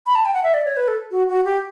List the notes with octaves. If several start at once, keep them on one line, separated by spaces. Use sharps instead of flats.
B5
A5
G5
F#5
E5
D5
C#5
B4
A4
F#4
F#4
G4